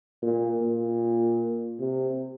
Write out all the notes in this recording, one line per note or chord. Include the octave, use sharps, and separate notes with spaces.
A#2
A#2
C3